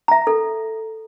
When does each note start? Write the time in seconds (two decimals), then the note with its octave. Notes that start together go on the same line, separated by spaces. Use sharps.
0.08 E5 A#5
0.27 A4